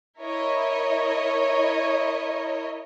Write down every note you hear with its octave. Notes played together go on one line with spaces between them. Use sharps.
E4 A#4 C#5 D#5